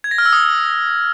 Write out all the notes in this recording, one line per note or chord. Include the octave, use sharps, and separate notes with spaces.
G#6
A#6
F6
E6
D#6